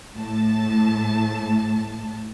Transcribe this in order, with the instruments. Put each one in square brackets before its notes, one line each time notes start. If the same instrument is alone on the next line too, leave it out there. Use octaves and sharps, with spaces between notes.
[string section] A2 A5